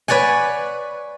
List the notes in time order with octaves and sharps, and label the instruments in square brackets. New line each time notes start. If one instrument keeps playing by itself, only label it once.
[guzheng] B4 C#5 D5 F#5 G#5